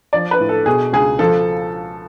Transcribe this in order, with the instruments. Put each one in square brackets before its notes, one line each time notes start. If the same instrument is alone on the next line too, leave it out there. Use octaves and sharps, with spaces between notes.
[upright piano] F3 D5
B4
A2
A4
B2 G#4
C#2 G#4
F3 A4